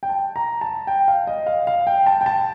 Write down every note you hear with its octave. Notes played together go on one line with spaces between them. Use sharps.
G5
A5
A#5
A5
G5
F5
D#5
F5
F5
G5
A5
G5
A5